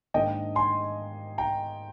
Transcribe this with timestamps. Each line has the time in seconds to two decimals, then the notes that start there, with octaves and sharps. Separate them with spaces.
0.14 G#2 D#3 A#3 D4 D#5 G5
0.55 G#5 C6
1.38 G5 A#5